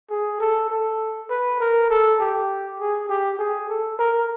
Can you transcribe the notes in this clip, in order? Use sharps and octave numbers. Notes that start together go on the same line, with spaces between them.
G#4
A4
A4
B4
A#4
A4
G4
G#4
G4
G#4
A4
A#4